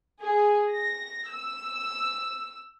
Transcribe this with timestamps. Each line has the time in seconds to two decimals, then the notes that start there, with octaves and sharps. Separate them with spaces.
0.22 G#4
0.72 A#6
1.31 E6